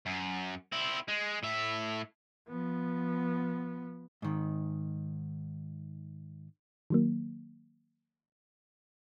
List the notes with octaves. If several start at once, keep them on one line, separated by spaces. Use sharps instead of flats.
F#2
C4 E4
G#3
A2 E5
F3 B3
G#2 D#3
D#3 F#3 A#3